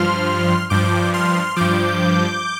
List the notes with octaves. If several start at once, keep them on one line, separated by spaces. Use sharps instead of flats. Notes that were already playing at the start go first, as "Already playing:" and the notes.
Already playing: G2 F3 C6 F6
G2 F3 D6 G6
C6 F6
G2 F3 D6 G6